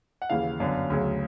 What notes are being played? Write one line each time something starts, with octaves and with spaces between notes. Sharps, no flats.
F#5
D#2 C#3 E3 F5
G1 F#2 D3
D2 C#3 F#3